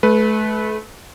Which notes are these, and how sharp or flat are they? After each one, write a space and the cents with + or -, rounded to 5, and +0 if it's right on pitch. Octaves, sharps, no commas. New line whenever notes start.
A3 -35 B4 +0